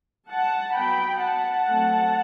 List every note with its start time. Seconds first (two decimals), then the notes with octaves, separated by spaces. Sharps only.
0.29 F#5 A5
0.75 F#3 B3 G5 B5
1.23 F#5 A5
1.69 F#3 A3 C4